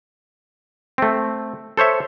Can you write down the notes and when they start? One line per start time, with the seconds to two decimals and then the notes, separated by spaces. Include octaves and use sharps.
0.98 A3 C4
1.77 A4 C5 C#5 E5